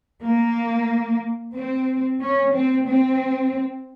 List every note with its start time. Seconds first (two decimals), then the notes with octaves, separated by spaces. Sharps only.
0.22 A#3
1.54 C4
2.21 C#4
2.53 C4
2.87 C4